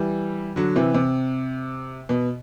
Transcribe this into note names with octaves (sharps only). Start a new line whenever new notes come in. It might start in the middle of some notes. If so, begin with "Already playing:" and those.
Already playing: E3 G3
D3 F#3
C3 E3
C3
B2